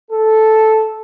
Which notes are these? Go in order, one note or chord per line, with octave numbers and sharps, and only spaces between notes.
A4